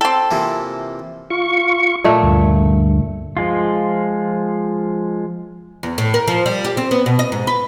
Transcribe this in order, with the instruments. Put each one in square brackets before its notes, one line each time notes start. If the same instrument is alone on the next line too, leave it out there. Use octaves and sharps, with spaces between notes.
[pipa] C4 A4 [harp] G5
[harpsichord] C3 F3 A#3 [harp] E3 E4
[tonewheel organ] F4 C#6
[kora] A#2 A3
[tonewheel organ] D2 G2
[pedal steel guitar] F3 G#3 F4
[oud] E2
A2
A#4
F3
G3
G4
C4
B3
B2
D#5
G#2
B4